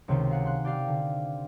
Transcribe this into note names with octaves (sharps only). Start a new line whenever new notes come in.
C#2 C3 D#3 C4 C#5 G6
F5 F#5 G#5
C6 F#6
G4 D5 F5 G5
D3